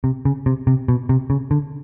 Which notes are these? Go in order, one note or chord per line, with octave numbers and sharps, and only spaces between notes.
C3
C#3
C3
C3
B2
C3
C#3
D3